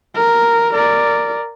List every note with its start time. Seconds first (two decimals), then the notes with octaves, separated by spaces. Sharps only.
0.15 A#4
0.74 A#4 D5